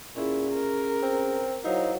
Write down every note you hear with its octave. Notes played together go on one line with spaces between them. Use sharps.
A#2 C#4 E4 G#4
A#4
C4
F#3 D#4 E4 C5 F5